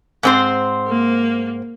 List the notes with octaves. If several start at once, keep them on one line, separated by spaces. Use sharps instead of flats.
G#2 C4 C5
A#3